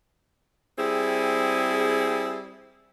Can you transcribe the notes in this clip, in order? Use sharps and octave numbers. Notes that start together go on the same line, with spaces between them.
G3 C4 E4 G#4